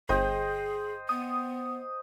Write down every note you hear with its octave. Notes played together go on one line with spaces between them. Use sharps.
G1 G#4 C5 D#5 G5
B3 D#6